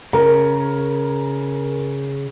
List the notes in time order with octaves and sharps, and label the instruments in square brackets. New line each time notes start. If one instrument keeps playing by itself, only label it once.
[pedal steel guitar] C#3 [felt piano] A#4 A#5